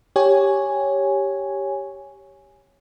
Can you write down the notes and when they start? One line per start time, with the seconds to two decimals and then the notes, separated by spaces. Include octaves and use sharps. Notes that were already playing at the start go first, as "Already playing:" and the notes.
0.16 G4 C#5 G#5